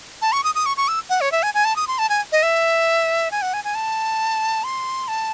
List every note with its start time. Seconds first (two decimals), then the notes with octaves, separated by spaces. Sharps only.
0.22 A5
0.32 C#6
0.44 D#6
0.55 D#6
0.66 C#6
0.77 C#6
0.88 E6
1.09 F#5
1.21 C#5
1.32 E5
1.43 G#5
1.54 G#5
1.65 A5
1.76 D#6
1.87 C6
1.98 A5
2.09 G#5
2.32 D#5
2.43 E5
3.31 G#5
3.42 F#5
3.53 G#5
3.64 G#5
3.75 A5
4.64 C6
5.08 A5